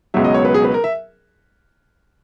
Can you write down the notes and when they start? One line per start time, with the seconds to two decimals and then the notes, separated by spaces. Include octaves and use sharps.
0.14 C#2 B2 F#3 E5
0.24 D#5
0.34 C#5
0.45 B4
0.54 G#4
0.64 B4
0.74 A#4
0.84 E5